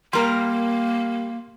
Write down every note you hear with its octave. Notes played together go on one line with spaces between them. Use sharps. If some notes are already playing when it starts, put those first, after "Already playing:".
G3 A#3 A#4 C6